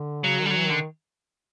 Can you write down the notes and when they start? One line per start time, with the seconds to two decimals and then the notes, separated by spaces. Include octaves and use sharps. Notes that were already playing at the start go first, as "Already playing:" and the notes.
Already playing: D3
0.24 C#3 F#3
0.40 D#3
0.44 D3 G3
0.51 F#3
0.56 E3
0.64 D#3
0.70 D3